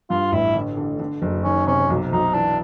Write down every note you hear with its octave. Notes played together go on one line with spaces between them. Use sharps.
G2 F4
A1 E4
D3
D3
D3
F#1
D#3 C#4
C3 C#4
B1
B1 D#4
E3 D4